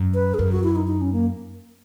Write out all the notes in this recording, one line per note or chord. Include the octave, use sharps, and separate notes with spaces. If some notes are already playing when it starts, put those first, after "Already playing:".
Already playing: F#2
B4
G#4
F#2 A#4
F#4
E4
D#4
D#4
C#4
A#3